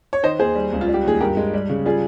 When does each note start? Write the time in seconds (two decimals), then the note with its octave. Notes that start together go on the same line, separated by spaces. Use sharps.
0.13 C#5
0.23 D#3 C5 D#5
0.39 D#2 G#4 C5
0.55 G3
0.73 C#2
0.81 F4
0.88 G3
0.94 G4
1.04 D#2 G#4
1.21 G2 G4 A#4
1.37 G#3
1.54 G3
1.69 C#3
1.85 G3 F4 G#4